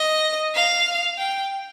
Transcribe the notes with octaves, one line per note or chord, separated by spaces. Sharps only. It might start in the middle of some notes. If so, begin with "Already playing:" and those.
Already playing: D#5
F5
G5